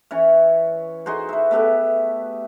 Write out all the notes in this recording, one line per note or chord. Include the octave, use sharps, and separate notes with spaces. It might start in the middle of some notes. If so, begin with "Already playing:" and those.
E3 C#4 C#5
D#4 F#4 G#4 C5
B4 E5
A3 B3 G4 E5